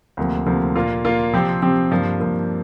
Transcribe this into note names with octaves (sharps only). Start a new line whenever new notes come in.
D2 C3 F3 A#3
D2 C3 F3 A#3
A#2 A#3 F4
A#2 A#3 F4
C3 F3 C4 G4
C3 F3 C4 G4
G2 F3 A#3
G2 F3 A#3